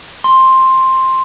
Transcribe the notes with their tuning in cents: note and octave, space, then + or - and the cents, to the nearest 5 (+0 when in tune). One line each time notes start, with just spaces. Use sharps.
C6 +10